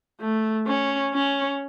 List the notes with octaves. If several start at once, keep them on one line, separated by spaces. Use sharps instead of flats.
A3
C#4
C#4